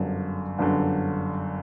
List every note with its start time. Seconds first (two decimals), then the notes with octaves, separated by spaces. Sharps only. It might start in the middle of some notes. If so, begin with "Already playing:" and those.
Already playing: G1 F#2 D3
0.59 G1 F#2 D3